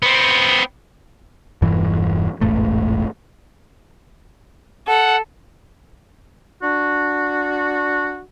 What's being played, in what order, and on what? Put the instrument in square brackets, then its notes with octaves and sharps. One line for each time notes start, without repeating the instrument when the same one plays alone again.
[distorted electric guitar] B3 C4
[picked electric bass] E1 G2 E3
E1 A1 G#2 A3
[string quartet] A4 [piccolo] F#5
[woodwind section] D4 F#4